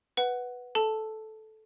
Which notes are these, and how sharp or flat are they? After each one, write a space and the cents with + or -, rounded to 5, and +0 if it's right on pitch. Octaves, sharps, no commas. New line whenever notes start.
B4 +0 F#5 +0
A4 -15 A5 +0 E6 +0